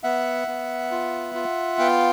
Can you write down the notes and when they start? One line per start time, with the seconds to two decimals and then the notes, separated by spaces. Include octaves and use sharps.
0.03 B3 E5 F#5
0.48 B3
0.91 F4
1.35 F4
1.79 B3 F5 G5